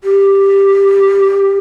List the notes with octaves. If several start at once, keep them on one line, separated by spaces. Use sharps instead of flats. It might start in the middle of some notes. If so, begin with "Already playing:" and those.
G4